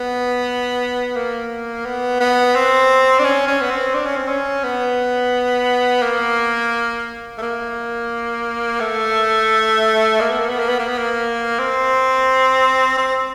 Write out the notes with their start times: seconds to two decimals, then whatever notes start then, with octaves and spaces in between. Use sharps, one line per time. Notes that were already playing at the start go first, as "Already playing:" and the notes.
Already playing: B3
1.17 A#3
1.86 B3
2.21 B3
2.56 C4
3.19 D4
3.24 C#4
3.47 C#4
3.61 B3
3.71 C4
3.94 D4
4.06 C#4
4.16 C4
4.28 C#4
4.64 B3
6.03 A#3
7.38 A3
7.42 A#3
8.81 A3
10.21 A#3
10.30 B3
10.40 A#3
10.50 B3
10.60 A#3
10.69 B3
10.80 A#3
10.89 B3
10.99 A#3
11.59 C4
12.98 C4